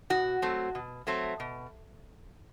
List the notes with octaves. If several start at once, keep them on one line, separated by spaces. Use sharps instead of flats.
B2 F#4
F#3 A3 C4
B2
F#3 A3 C4
B2